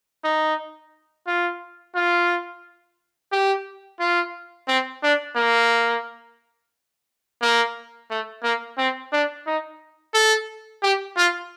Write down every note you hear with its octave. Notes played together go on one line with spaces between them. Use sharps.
D#4
F4
F4
G4
F4
C4
D4
A#3
A#3
A3
A#3
C4
D4
D#4
A4
G4
F4